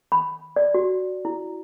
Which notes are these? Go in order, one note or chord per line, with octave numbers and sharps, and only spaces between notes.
B5
D5
F#4
E4